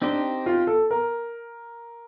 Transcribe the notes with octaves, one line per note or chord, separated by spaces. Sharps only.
C4 D4 D#4 G4 C5
F4
A4
A#4